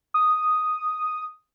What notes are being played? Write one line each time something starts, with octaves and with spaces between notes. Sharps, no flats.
D#6